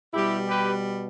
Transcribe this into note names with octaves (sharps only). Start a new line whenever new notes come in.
B2 G3 E4 G4
G4 B4